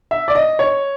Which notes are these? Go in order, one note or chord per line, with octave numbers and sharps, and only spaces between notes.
E5
D5
D#5
C#5